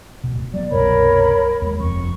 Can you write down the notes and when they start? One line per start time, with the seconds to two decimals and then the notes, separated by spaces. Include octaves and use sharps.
0.24 D1 B2
0.54 F#3 A#3 B3 D5
0.71 C2 F#2 B2 A#4 C#5 B5
1.62 D#2 G#3
1.80 F1 F2 C#6